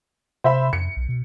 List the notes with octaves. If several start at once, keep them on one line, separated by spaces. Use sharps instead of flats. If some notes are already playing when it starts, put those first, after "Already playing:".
C3 C5 E5 B5
F2 C#7
B1
B2